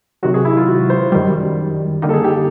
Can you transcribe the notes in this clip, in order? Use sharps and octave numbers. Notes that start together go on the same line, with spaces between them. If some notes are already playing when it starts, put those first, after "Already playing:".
C3 D#3 F#3 F#4
G#4
E4
F4
F#4
C5
F#2 D#3 G3
D3 G3 A#3 D#4
A4
G#4
G4